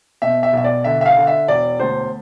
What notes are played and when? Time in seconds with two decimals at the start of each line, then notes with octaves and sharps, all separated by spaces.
0.22 B2 E5
0.43 E5
0.53 B1 E5
0.64 D5
0.84 D3 E5
1.01 E5
1.06 F5
1.17 D3
1.27 E5
1.48 E1 D5
1.80 D2 C5